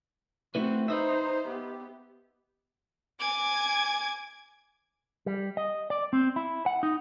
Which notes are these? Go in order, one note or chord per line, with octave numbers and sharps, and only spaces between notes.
A3 C4 E4 F#4 B4
D#4 B4 C5 D#5 E5
B3 G4
G#5 D6 G#6
G3
D#5
D5
C4
E4
F#5
D#4